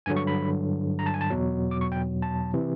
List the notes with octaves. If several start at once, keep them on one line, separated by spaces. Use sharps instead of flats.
G2 D3 F#3 G#5
C#6
B5
A#5
A5
G#5
A5
E2 B2 F#3
D6
C#6
G5
A5
C3 E3